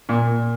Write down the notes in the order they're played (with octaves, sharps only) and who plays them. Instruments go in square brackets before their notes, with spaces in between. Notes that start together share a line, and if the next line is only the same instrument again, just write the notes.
[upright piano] A#2